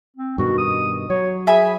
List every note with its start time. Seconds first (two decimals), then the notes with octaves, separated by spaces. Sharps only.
0.17 C4
0.38 G2 B2 D#3 F#4
0.58 D#6
1.10 F#3 C#5
1.47 G#4 E5 G#5 B5